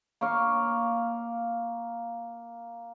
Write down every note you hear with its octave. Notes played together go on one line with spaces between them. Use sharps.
A#3 C#5 F5